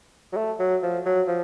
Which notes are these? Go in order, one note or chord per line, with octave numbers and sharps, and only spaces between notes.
F#3
A3
F#3
F3
F#3
F3